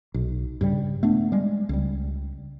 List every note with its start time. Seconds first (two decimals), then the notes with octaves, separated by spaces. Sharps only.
0.14 B1
0.61 G2 C#3 G3
1.03 A3 B3 D4
1.32 G3 G#3
1.69 C#2 G3